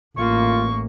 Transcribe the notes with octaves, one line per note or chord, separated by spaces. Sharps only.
A1 A#3 F4 C#6